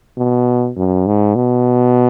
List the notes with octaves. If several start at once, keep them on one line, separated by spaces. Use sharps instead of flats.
B2
F#2
G#2
B2